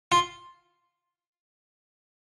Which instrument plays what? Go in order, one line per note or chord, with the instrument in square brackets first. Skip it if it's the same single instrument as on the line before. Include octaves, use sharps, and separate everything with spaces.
[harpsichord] F4